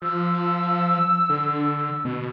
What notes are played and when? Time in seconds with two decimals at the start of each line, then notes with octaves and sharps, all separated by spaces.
0.02 F3 E6
1.29 D3
2.05 B2